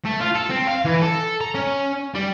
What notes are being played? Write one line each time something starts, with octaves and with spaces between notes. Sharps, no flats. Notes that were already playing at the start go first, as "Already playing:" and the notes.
A3
F4
A4
C4
F5
E3
A4
A#5
C#4
G3